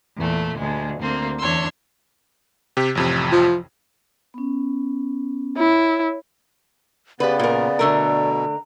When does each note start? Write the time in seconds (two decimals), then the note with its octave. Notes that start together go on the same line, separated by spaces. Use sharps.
0.16 E2 A#2 A3
0.55 D2 G#3
0.99 D2 A#3 C4
1.38 E2 D4 C#5 C6 E6
2.77 C3 G4
2.95 A1 F2 C3
3.32 F3
4.34 B3 C#4
5.57 E4 C#5
7.20 C#3 B3 G4 B4 D5
7.39 A#2 A#4
7.79 B2 D3 A3 A#4 A#5